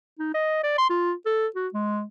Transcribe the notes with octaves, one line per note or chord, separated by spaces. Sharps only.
D#4
D#5
D5
C6
F4
A4
F#4
G#3